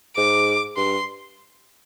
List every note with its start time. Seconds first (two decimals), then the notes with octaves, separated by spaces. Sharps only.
0.17 G#2 D6
0.77 G2 C6